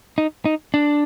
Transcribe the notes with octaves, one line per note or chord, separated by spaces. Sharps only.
D#4
D#4
D4